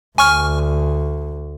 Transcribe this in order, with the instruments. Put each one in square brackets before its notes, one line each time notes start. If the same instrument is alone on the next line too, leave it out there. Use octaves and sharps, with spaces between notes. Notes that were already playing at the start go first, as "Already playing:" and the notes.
[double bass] D2 [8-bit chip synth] G#5 C#6 F6